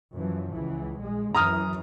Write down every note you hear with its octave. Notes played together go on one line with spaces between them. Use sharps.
F#2 E3 F3
C#2 E3
A#1 G#3
F#2 E3 A#5 D#6 F6